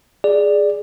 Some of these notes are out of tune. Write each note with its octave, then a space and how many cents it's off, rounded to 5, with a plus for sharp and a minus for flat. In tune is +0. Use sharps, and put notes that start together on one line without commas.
G#4 +0 D5 +0